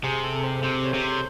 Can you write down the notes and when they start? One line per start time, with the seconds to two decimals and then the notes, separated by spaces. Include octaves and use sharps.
0.04 C3 G#4
0.24 A4
0.44 C5
0.64 C3 C5
0.85 C#5
0.94 C3
1.04 C5